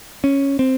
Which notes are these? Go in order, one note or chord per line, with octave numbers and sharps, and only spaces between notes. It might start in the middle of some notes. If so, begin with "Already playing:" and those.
C#4
C4